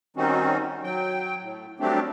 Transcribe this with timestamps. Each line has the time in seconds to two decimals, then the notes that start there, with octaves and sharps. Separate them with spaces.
0.17 D#3 G3 C4 C#4 D#4 F#4
0.83 F#3 G5
1.41 A2
1.80 F#3 G3 A3 C4 D4 G4